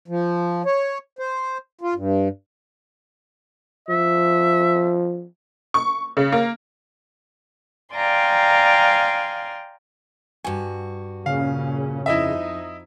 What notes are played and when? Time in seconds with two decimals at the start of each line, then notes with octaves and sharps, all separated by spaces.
0.08 F3
0.66 C#5
1.19 C5
1.81 F4
1.95 G2
3.89 F3 E5
5.74 C#6
6.17 C#3
6.32 A#3
7.95 D5 F5 G5 G#5 A#5 C6
10.44 G2 F#4 G#5
11.26 A#2 C#3 C#4 F5
12.06 F2 D#4 E4 D#5 E5